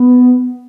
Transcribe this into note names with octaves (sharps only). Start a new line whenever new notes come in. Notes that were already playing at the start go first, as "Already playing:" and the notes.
Already playing: B3